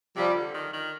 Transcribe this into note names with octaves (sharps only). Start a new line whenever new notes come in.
C3 F3 G3
D3
D#3
D#3